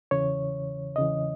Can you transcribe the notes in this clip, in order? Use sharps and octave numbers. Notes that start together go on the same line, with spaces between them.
E2 C#3 E3 C#5
E2 C#3 E3 D#5